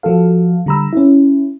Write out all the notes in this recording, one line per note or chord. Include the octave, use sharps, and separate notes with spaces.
F3 F#4 A4 F5
D3 G3 A#5 B5 E6
C#4 E4